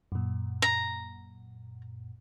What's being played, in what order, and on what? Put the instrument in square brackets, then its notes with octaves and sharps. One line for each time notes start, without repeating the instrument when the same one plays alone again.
[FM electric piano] F#2 A#2
[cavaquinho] A#5